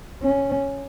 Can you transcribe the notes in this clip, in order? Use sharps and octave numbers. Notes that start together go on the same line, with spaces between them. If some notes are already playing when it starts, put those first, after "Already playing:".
C#4